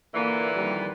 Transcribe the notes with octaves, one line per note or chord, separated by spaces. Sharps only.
A#2 D3 E3 A#3
F2 D#3 G3